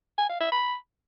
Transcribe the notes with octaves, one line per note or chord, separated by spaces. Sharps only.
G#5
F5
E5
B5